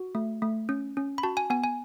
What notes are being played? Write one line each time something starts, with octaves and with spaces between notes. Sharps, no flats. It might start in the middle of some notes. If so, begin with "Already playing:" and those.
Already playing: F#4
A3
A3
C#4
C#4
B5
F#4 A5
G#5
B3 G#5
G#5